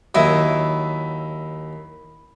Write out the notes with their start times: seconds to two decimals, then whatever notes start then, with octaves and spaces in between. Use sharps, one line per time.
0.15 D#2 F#3 E4 D#5 E5